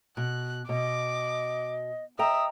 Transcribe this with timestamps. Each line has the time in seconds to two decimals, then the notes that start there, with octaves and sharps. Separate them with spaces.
0.17 B2 F#6
0.69 B2 D#5 D6
2.19 D#5 E5 G5 A#5 D#6